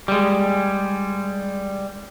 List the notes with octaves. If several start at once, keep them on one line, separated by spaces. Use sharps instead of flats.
G3 G#3